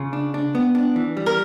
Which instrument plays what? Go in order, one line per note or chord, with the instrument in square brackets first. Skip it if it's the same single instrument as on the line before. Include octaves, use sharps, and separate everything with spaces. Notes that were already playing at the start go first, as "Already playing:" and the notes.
Already playing: [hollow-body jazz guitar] C#3 [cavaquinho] F4
[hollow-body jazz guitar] D4
D4
B3
D4
E3
G3
[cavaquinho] A#4